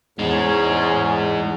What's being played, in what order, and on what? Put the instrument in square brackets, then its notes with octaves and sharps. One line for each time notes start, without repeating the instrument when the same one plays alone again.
[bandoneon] E2 [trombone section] G#2 C#4 [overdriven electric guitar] G#3 D#4